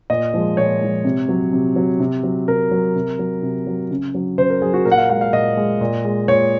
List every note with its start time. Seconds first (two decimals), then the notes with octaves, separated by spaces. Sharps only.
0.10 A#2 D#5
0.34 F3 G#3
0.57 A#2 C#5
0.81 F3 G#3
1.05 C3
1.29 F#3
1.53 C3
1.76 F#3
2.00 C3
2.23 F#3
2.48 C3 A#4
2.71 F#3
2.95 C3
3.19 F#3
3.42 C3
3.67 F#3
3.91 C#3
4.15 F#3
4.38 C#3 C5
4.50 A#4
4.62 F#3 G#4
4.73 F#4
4.85 A#2 A#4
4.91 F#5
4.97 F5
5.09 G#3 F#5
5.21 F5
5.33 A#2 D#5
5.57 G#3
5.81 A#2
6.05 G#3
6.28 A#2 C#5